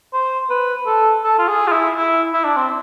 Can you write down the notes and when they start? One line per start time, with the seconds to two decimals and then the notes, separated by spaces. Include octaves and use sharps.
0.14 C5
0.50 B4
0.86 A4
1.23 A4
1.39 F4
1.48 G#4
1.67 F4
1.72 E4
1.97 E4
2.34 E4
2.45 D4
2.56 C4